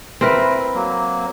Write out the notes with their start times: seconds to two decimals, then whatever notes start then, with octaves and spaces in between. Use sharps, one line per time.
0.21 C4 E4 A#4 B4
0.74 F#3 A#3